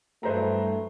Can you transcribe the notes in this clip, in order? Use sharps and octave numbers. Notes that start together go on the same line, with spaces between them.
G2 E3 F#3 A3 B4 C5 A#5